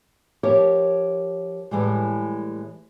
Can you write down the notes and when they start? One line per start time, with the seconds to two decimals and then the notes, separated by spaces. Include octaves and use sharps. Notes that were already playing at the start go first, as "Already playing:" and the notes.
0.43 F3 G4 A#4 C#5 E5
1.71 A2 E3 G3 G#3